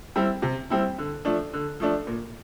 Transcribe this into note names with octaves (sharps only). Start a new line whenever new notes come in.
G3 C4 E4
C3
G3 C4 E4
D3
F3 A3 D4
D3
F3 A3 D4
A#2